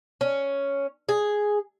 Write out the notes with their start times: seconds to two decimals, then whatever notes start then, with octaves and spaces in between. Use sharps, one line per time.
0.21 C#4
1.09 G#4